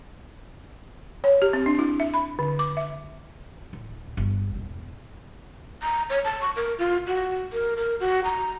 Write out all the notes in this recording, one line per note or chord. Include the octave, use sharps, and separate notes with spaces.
C#5
G4
C4
D4
E4
E5
B5
D3
D6
E5
D1
G1
E1
A#5
C#5
A5
C#6
A#4
F4
F#4
A#4
A#4
F#4
A#5